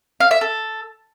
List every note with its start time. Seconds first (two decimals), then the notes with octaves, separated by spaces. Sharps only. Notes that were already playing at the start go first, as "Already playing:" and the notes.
0.20 F5
0.31 E5
0.41 A4